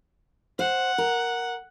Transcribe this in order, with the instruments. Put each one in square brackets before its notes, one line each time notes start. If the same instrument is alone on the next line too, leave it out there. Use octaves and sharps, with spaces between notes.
[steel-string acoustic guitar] C5 [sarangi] F#5
[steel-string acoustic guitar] A#4